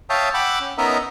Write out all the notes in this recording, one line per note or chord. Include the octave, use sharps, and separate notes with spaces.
C#5 E5 F5 G5 A5 D#6
F#5 G5 B5 D6 E6 F#6
C#4
B3 C#4 D#4 A#4 D#5 E5